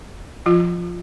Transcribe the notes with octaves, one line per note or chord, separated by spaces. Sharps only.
F3 F4